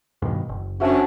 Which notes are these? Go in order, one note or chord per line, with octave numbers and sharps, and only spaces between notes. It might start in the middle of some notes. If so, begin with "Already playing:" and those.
G2 B2 D#3
F#1
F#2 C#4 D4 F#4 C5 E5